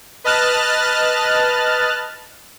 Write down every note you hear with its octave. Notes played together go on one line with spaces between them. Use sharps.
B4 D#5 A5 F6 F#6 A6